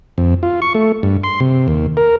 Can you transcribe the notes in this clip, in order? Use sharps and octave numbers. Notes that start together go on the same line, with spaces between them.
F2
F4
C#6
A3
G2
C6
C3
D#2
A#4